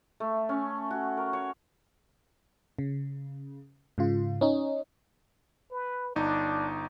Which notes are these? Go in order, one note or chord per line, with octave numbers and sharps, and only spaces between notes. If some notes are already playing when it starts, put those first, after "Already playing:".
A3
C#4
F#4
A#4
C#5
C#3
G#2 C#3 F4
C#4 D#4
B4
G1 D4 D#4